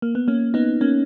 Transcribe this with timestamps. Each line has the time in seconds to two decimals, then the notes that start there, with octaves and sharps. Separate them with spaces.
0.02 A#3
0.15 B3
0.28 A#3 C#4
0.54 B3 D#4
0.81 A#3 C#4